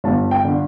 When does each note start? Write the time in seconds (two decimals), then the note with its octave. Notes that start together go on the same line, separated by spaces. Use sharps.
0.04 G1 A5
0.31 G5
0.45 D3